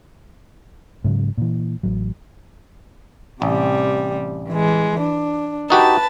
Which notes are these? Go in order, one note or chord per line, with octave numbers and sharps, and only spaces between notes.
G#2 C#3 F#3
A#2 E3
A1 F#3
A1 C3 G3
E3 G#3
D4
D#4 F#4 G4 B4 A5 A6